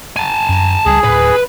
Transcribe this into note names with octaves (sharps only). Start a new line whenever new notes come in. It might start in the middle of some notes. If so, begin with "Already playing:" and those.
G#5 A5
F#2
C#2 F3 G3 G#4
D1 G1 A2 B4